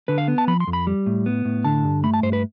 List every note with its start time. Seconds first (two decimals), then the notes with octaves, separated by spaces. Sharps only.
0.08 D3 B4
0.18 F5
0.28 B3
0.38 A5
0.48 F3 B5
0.60 C6
0.67 F2
0.73 B5
0.87 G3
1.06 A2
1.26 B3
1.45 A2
1.64 D3 A5
1.84 G2
2.04 A3 B5
2.14 A5
2.23 G2 C5
2.33 B4